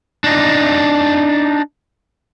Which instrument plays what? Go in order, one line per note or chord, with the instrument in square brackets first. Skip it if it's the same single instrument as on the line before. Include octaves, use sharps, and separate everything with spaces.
[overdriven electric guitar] D4 D#4